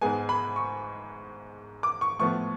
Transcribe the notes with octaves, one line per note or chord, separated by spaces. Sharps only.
G#2 G#3 B3 G#5
B5
C#6
D6
C#6
A2 F3 B3 C#6